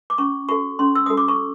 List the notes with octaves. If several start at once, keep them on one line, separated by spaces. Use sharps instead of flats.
D6
C#4 C#6
F#4 A4 C#6
C#4 C6
E6
F#4 A4 D#6
D6
C#6